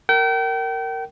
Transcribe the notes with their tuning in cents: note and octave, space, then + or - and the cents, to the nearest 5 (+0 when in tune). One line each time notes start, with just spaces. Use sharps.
A#4 -15 G5 -35